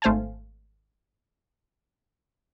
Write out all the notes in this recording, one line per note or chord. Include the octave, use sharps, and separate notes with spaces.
G#1 A3 C5 F5 G#5 A5